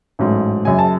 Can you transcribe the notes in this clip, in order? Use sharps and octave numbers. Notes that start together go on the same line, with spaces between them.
A1 G#2 F#3 A3
F#1 F#2 C#3 G#5
A5